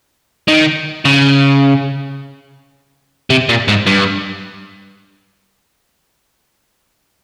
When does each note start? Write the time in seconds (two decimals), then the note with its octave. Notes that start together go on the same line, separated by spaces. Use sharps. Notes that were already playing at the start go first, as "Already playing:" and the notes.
0.48 D#3
1.05 C#3
3.30 C3
3.49 A#2
3.68 G#2
3.86 G2